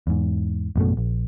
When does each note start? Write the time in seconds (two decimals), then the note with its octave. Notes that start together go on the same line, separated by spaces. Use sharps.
0.07 E2 G#2
0.76 A1 F#2 B2 A3
0.97 A#1